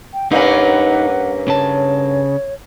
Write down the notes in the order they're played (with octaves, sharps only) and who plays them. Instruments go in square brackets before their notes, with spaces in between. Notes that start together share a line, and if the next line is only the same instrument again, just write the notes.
[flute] G5
[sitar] G2 A#3 C#4 [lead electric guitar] D#4 B4 [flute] F#5
[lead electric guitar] C#3 A5 [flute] C#5